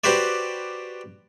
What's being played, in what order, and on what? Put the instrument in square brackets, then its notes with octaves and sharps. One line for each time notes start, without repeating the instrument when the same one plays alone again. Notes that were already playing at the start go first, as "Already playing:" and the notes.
[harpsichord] F#4 G4 B4 C5 D5